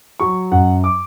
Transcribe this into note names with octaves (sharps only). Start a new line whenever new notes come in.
F#3 C#6
F#2 F#5
D6